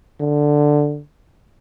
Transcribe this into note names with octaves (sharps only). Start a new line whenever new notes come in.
D3